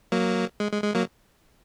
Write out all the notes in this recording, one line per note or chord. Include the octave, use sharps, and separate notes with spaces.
F#3 A#3
G#3
G#3
G#3
F#3 A#3